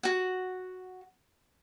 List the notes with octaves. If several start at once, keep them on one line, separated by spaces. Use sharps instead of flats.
F#4 F#5